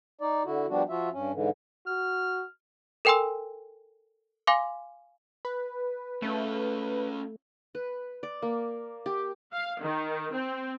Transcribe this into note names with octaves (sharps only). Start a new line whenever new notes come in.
D#4 D5
D3 E4 F#4
F3 G3 B3 D4 F#4
F3 F4 F#4 E5
G2 C#4
G#2 D3 E3
F#4 F6
A4 A#4 G5 G#5 C6 E6
F5 G#5 C6 D6
B4
A3 C#4 F4
B4
D5
A#3
G4
F5
D#3
C4